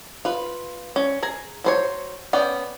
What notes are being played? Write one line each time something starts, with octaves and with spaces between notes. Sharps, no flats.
F4 B4
C#4
G#4 G#5 A#5
F#3 C5 C#5
B3 C#4 D5 G5